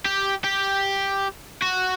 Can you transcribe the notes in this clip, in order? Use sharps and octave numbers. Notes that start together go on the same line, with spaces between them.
G4
G4
F#4